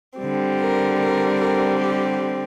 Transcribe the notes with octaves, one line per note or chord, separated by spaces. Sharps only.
D3 G3 C4
A#4
A#4
A#4
G4